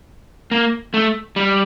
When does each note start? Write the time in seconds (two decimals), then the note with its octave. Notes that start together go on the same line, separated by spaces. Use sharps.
0.51 A#3
0.94 A3
1.36 G3